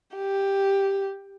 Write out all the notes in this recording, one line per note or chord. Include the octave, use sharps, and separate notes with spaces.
G4